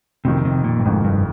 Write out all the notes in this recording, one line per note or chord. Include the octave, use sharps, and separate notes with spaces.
F1 F2 C3 D#3
C3
A#2
G2
F1 F2 G#2 D#3
G2